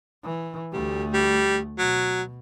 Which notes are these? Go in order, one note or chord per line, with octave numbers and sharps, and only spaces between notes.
E3
D2 G3 A3
G3
B2 F#3